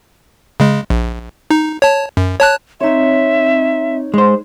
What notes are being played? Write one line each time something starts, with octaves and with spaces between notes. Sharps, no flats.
C#3 G#3
A#1
D#4
C#5 A5
F#2
C#5 A5 F#6
C4 D#4 C#5 D#5 E5
G#3 C5